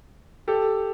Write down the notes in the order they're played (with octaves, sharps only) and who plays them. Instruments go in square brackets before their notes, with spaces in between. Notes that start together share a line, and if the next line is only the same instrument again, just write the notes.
[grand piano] G4 A4